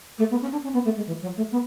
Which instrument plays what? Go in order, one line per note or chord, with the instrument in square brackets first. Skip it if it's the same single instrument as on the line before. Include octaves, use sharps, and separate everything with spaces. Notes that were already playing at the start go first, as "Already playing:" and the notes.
[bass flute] A3
B3
C#4
D4
C#4
B3
A3
G#3
E3
F#3
A3
B3